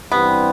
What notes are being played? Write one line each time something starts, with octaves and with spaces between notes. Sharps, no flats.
G2 E3 G3 B3 C4